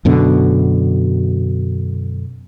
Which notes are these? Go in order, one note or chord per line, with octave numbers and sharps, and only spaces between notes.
F#2 B2 D3